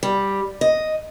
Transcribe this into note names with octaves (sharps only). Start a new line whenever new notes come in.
G3
D#5